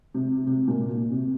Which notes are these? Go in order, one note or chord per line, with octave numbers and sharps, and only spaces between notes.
C3
C3
A#2
C3